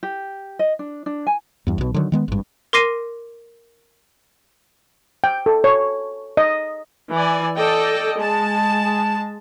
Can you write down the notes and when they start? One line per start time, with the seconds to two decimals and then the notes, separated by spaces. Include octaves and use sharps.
0.03 G4
0.59 D#5
0.79 D4
1.06 D4
1.27 G#5
1.67 E2 G2
1.78 B1 B2
1.94 D3 D#3 F#3
2.12 D#3 G#3 B3
2.28 G#1 G2
2.73 A#4 C6 D6 A#6 C7 D#7
5.24 G5
5.46 A4
5.64 C#5
6.37 D#5
7.11 E3 D5 G#5
7.56 A4 D5 D#5 G5
8.21 G#3 A5